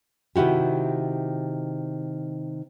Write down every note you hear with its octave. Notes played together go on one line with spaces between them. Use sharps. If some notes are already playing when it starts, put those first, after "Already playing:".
C3 D#3 E4 F#4 G4